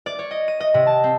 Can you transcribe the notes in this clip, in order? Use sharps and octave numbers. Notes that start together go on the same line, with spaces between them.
D5
C#5
D#5
D#7
D#5
C3
A5
C4